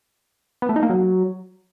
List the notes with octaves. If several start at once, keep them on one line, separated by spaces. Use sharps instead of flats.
B3
A3
D#4
A#3
F#3